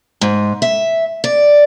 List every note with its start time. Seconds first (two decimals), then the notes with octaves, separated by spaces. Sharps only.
0.21 G#2
0.62 E5
1.24 D5